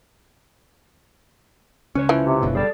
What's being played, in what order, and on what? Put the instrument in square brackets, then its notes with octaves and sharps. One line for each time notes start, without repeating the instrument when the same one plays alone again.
[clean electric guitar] C#2 B4 C#5 [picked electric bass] C#4
[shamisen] E3 F3
[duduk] C3
[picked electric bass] F#1 B2 D3
[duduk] G3 [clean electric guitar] G#4 A4 D5